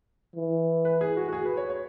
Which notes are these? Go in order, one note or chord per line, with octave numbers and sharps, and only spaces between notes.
E3
B4
G#4
F#4
F#4
G#4
B4
C#5
C#5